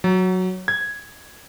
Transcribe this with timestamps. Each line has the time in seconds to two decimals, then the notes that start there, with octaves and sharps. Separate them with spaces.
0.04 F#3
0.68 G#6